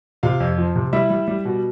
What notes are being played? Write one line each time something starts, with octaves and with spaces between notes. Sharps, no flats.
C3 F4 F5
F2
F3
C3
G3 E4 E5
G3
G3
B2